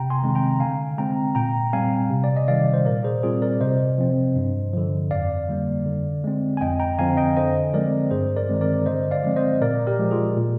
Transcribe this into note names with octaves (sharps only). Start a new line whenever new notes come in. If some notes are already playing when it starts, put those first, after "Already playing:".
Already playing: C3 G5 A#5
G#5 C6
D#3 G#3 C4
G5 A#5
D3 F5 G#5
G#3 C4 G5 A#5
A#2 G5 A#5
G3 C4 F5 G#5
C3
D5
D#5
D#3 G3 D5 F5
C5
A#2 A#4 D5
G#4 C5
G3 C4 F4 G#4
A#4 D5
C3 C5 D#5
F3 C4
G2
D3 F3
F2 D5 F5
D3 G3 A#3
D3
G#3 C4
G#5
F2 D#5 G5
G5 A#5
D3 F3 C4 F5 G#5
D#5 G5
D3 C5 D#5
F3 G#3 C4 A#4 D5
G2 G#4 C5
A#4 D5
D#3 G#3 C4
A#4 D5
D3 C5 D#5
D5 F5
F3 G#3 C4
C5 D#5
A#2 A#4 D5
G4 A#4
F3 G#3
F4 G#4
A#2